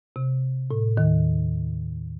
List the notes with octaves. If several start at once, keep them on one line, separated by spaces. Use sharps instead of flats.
C3
A2
D#2 D#3